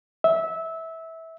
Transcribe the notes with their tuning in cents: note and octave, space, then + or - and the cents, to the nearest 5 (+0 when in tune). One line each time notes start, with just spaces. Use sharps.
E5 -20